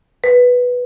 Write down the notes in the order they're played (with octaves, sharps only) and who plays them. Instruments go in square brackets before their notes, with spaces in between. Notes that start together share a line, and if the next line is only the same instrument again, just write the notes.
[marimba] B4